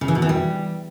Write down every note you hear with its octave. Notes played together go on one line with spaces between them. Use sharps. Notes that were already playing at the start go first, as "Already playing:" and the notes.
C#3
E3
B2
E3
G3